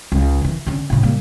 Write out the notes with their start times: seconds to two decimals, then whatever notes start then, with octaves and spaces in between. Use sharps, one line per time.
0.12 C#2
0.41 D#3 E3
0.67 D3 C#4
0.90 A2 C#3
1.03 G3 A#3